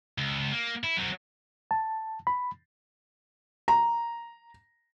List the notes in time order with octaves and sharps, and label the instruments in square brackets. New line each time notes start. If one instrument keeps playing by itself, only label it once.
[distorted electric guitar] C#2
A#3
E4
F#3 C4
[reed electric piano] A5
B5
[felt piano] A#5